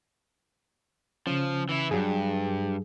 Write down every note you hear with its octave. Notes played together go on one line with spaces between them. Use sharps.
C#3 F3 C#4
E3 E4
G2 F#3 G#4